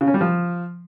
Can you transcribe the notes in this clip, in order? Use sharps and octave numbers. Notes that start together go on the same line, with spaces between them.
C#3
C#4
G3
F3